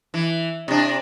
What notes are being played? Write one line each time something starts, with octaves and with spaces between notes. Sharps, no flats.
E3
C3 D4